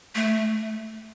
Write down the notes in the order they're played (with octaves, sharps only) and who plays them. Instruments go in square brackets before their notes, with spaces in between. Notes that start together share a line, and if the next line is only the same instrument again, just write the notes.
[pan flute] A3